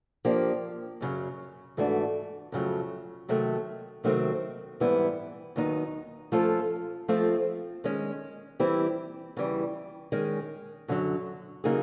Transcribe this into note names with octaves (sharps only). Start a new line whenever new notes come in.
F3 A#3 D4 G4
F#2 C#3 F#3
G#2 E3 A3 D4 F#4
F2 C#3 F#3 A3
C3 D#3 F#3 A3
C3 D#3 F#3 A3 C4
G#2 E3 G3 B3 E4
D#2 D#3 F#3 B3 D#4
F3 A3 C#4 F4 A4
F3 A3 C4 F4
D#3 G#3 C#4
E3 G3 C4 E4 G4
E2 C#3 E3 G3
D#3 G#3 C#4
F#2 D3 F#3
C#3 F#3 A#3 D#4 G#4